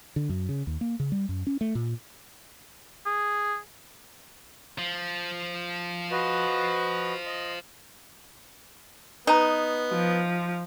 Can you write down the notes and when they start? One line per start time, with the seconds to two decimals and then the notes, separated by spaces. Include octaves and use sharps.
0.16 D3
0.29 F#2
0.49 C#3
0.67 D#2
0.81 A#3
1.00 C#3
1.12 G3
1.29 F#2
1.47 C#4
1.61 A3
1.75 A#2
3.06 G#4
4.78 F3
6.11 F#4 B4 D#5
7.26 D#5 C6
9.27 B3 D#4 B4 A#5
9.92 F3